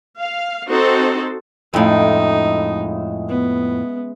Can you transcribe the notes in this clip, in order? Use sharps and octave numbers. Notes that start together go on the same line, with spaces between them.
F5
C4 D#4 F#4 A4 C5
F2 A2 C#3 G#3 D#4 E5
B3